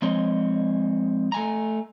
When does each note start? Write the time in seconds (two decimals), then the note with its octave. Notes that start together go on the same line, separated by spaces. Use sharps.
0.02 F3 G#3 C4 C#5 D#5
1.32 A3 G#5 A#5